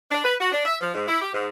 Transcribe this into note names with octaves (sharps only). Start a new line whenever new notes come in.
D4
B4
F#4
D4
E5
F3
G#2
E4
G4
G#2